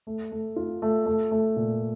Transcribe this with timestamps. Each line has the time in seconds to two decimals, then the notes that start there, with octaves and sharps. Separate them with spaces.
0.07 A3
0.32 A3
0.56 F4
0.82 A3
1.06 A3
1.31 A3
1.56 A#2